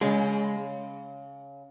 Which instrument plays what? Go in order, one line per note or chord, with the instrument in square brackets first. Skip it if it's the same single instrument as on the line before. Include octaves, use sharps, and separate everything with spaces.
[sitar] C#3 [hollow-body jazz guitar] G#3